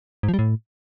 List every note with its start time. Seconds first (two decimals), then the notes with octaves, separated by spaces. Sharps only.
0.23 G#2
0.28 F3
0.34 G3
0.39 A2